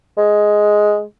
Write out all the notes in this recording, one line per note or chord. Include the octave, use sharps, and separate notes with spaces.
G#3